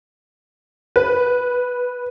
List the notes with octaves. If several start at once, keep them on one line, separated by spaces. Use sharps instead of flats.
B4